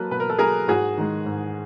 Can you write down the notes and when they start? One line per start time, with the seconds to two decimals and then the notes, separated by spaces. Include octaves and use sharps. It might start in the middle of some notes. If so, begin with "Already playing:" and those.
Already playing: F#3 A#3 A4 B4
0.11 B2 B4
0.20 A#4
0.30 A4
0.39 F#3 A#3 G#4 A#4
0.68 G#2 F#4 G#4
0.97 D#3 G#3
1.26 G#2